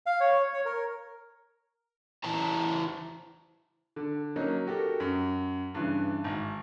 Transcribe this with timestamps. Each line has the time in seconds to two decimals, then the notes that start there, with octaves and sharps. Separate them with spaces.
0.06 F5
0.20 C#5
0.53 C#5
0.65 A#4
2.24 E3 E4 C5 A5 A#5
3.96 D3
4.36 F#3 A#3 C#4 D#4
4.67 F#4 G4 A4 A#4
5.00 F#2
5.74 G2 C#3 E3
6.24 G#1